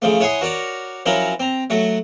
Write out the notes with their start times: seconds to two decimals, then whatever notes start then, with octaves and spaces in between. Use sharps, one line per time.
0.02 C#3 F3 A3
0.20 E4 C#5 F#5 G#5 C6 D#6
0.41 F#4 A#4 C#5 D5
1.06 F3 F#3 C#4 E4 A#4
1.40 C4 A#5
1.70 F#3 A3 F#4